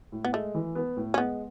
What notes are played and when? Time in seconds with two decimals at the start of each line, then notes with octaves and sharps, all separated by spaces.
0.12 A2
0.25 B3
0.33 G#3 A3
0.55 E3
0.75 B3
0.97 A2
1.14 C#4
1.17 G#3 B3